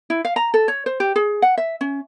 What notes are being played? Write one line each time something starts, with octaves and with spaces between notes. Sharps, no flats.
E4
F5
A#5
A4
C#5
C5
G4
G#4
F#5
E5
C#4